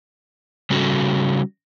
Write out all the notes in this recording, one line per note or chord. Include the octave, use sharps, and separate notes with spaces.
C#3 G3 C#4 F#4 A4